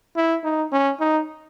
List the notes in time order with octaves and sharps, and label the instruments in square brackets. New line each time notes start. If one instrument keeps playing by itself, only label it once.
[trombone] E4
D#4
C#4
D#4